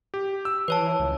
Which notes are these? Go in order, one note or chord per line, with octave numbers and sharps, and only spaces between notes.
G4
E6
E3 B4 C#5 A5
C#2